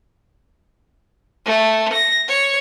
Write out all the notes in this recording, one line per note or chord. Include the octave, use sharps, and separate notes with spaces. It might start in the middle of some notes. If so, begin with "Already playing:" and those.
A3
A#6
C#5